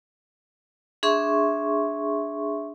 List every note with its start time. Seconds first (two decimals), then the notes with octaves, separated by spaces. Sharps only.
1.03 D4 G#4 E5 C6 C#6